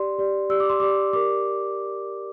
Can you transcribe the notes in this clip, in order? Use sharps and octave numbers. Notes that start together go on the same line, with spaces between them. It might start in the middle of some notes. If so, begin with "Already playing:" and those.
Already playing: G4 D5 C6
G4 D5
G4 D5 E6
D6
C6
G4 D5 D6
G4 A#4 D5 D6